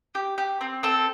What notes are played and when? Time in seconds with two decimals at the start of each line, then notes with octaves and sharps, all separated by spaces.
0.15 G4
0.38 G4
0.61 C4
0.83 C4 A4